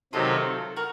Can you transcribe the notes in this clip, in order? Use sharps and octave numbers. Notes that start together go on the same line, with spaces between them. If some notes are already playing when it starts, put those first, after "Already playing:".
C3 D#3 F#3 C4 F4 A4
F#4 A#4